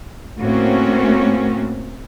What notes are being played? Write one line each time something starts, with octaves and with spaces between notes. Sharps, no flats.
A2 A3 A#3 C4 C#4 F#4